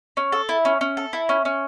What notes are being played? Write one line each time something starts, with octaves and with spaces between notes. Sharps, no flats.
C#4
A4
E4
C#4
C#4
A4
E4
C#4
C#4